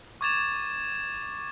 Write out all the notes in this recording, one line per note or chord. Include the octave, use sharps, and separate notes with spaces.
C#6 D6 G#6 A6 E7 F7